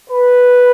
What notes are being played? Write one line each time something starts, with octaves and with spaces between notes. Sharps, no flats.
B4